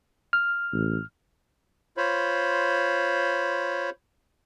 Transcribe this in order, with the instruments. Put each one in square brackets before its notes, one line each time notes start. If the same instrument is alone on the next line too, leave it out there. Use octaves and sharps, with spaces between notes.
[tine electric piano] F6
[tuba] A1
[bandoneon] F4 C5 C#5 B5